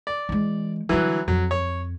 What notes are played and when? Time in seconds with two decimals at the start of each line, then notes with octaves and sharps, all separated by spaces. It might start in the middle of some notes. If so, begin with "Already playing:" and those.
0.07 D5
0.29 E3 G#3
0.89 D3 E3 F#3 G3
1.28 F2 F#3
1.51 C#5